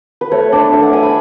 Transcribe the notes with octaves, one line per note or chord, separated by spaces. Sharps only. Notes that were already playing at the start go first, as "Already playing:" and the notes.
B4
A3 C#5
D4 D5
A3 E5
F#5
D4 G#5
B5